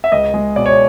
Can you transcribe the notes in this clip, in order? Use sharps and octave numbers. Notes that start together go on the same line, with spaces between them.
E5
C#2 D#5
G#3
B2 D5
C#5